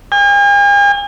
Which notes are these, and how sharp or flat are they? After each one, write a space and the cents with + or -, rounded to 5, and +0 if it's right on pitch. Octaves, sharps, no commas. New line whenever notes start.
G#5 -45